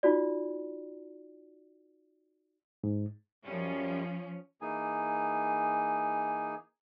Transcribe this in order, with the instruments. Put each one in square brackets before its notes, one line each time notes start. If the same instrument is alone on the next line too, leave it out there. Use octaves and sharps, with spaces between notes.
[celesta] D#4 F4 F#4 D5
[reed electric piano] G#2
[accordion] F#2 G3 [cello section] F3 C#4
[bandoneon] E3 A#3 D#4 G#4 G#5